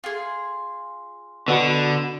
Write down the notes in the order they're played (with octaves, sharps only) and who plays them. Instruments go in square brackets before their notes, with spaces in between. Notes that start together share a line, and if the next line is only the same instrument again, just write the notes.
[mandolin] F4 G#4
[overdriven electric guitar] D3 [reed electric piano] B3 F#4 B5